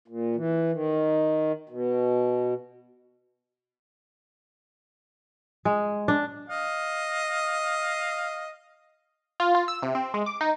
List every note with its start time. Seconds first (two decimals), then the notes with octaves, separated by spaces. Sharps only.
0.08 A#2
0.36 E3
0.72 D#3
1.69 B2
5.65 G#3
6.08 D4
6.50 D#5 F5
9.40 F4
9.55 F4
9.68 E6
9.83 C3
9.95 C4
10.14 G#3
10.26 D6
10.41 D#4